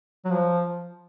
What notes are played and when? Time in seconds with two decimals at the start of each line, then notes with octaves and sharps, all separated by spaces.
0.25 F#3
0.31 F3